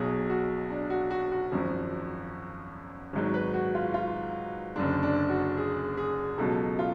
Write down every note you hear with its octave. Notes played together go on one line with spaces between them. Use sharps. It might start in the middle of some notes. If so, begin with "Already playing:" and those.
Already playing: B1 B2 F#3 G#4
F#4
D4
F#4
F#4
F#4
G#1 F#2 F3
G#1 G#2 F#3
B4
F#4
F4
F4
F#1 F#2 D3 D4
D4
F#4
G#4
G#4
C#2 B2 F#3 A4
F4